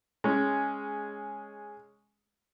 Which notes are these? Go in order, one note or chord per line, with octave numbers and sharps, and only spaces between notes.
G#3 C#4